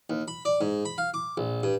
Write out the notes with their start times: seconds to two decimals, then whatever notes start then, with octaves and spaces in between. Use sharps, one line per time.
0.10 D#2
0.28 B5
0.45 D5
0.61 G#2
0.85 B5
0.98 F5
1.14 D6
1.37 A#1
1.63 G2